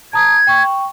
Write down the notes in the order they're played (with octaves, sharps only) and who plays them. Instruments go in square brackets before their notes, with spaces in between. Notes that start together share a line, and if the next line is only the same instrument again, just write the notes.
[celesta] A5 A#5 D#6 [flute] G#6
[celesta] G5 C#6